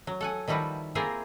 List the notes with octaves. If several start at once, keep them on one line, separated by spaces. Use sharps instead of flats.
F#3
A4 F#5 G#5
D#3 F3 G3 E4 F#4 B4
A#3 C4 E4 F4 G#4 A#4